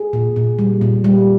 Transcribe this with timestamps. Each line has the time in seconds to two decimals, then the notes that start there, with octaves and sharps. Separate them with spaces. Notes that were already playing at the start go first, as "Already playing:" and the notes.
Already playing: G#4
0.13 A#2
0.36 A#2
0.59 G3
0.81 A#2
1.04 G3